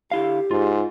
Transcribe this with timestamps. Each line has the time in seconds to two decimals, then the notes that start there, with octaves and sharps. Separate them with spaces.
0.12 D3 E4 G4 F5
0.51 G#2 F4